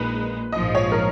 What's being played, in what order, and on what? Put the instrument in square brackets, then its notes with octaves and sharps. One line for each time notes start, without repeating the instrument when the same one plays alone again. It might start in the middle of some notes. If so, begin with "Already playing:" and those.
Already playing: [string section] A#1 A#2 G#3 D#4 [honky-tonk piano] B4
[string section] A#1 G#2 F3 [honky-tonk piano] D#5
[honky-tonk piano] C#5
A#4